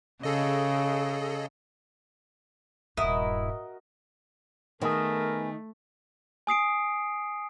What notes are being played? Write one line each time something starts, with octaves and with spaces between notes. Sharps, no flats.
C#3 G#4 A4 D#5
D#1 G2 E4 F#4 A#4 D#5 D#6
D#3 A3 B3 G#4 A#4
G#5 D#6 C7 D7